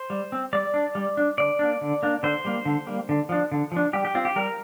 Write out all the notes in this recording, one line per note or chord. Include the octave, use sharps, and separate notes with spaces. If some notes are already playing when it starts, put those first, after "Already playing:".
Already playing: C5
G3
C4
G3 D5
D4
G3
D4
D3 D5
A#3 D4
D3
A#3 D4
D3 C5
G3 A#3
D3
G3 A#3
D3
F3 D4
D3
F3 D4
G3 G4
G4
C4 F4
G4
G3 A#4